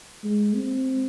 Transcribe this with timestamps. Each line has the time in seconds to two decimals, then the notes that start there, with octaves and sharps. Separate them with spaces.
0.24 G#3
0.56 C4